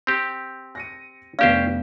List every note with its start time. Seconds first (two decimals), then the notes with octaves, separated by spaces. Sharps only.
0.07 C4 G4
0.75 A#6 C#7 D#7
1.39 F1 B3 C#4 D4 G4 C5 F5